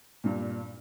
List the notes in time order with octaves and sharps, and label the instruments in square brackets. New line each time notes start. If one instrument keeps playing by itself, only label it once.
[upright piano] G2 A#2